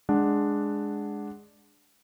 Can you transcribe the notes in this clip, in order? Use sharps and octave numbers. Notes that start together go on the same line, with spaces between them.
G#3 D4 F#5